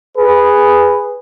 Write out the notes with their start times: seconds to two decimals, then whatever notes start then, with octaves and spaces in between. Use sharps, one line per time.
0.17 G#4 B4